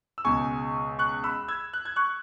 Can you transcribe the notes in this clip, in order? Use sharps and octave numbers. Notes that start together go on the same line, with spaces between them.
E6
C#2 B2 G#3 G#5 C#6
C#6 F#6
B5 E6
E6 G#6
F#6
G#6
C#6 F#6